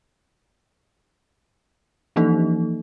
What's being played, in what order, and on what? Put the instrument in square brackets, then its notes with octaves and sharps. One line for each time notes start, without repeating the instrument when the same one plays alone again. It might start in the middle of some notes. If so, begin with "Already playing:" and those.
[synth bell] E3 F3 A#3 D#4 A4